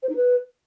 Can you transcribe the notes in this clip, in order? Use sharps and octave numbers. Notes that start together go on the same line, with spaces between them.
C5
D#4
B4